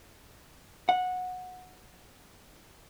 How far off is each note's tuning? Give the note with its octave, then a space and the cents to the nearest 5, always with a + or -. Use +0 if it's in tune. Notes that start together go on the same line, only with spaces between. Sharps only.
F#5 -15